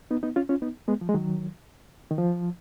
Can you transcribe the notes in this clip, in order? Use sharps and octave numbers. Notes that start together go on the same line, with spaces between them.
B3 D#4
B3 D#4
C#4 F4
C#4 F4
B3 D#4
G#3 B3
F3
G#3
D#3 F#3
D#3
F3